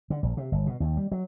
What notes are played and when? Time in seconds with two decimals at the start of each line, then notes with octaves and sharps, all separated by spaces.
0.10 D3
0.23 A#1
0.37 C3
0.52 G1
0.67 B2
0.80 D#2
0.97 G3
1.12 F#3